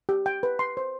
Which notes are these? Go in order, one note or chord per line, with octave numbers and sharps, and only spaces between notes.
G4
G5
B4
C6
C5